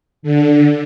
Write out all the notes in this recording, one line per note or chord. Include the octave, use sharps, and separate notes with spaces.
D3